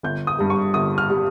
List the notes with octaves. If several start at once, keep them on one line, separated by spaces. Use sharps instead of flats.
G1 G6
D#6
G2 G3
C#6
G1 D#6
F6
G3